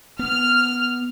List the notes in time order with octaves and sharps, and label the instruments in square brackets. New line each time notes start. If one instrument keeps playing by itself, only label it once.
[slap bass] B3 [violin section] F6